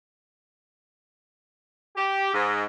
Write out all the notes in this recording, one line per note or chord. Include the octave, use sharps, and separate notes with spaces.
G4
G#2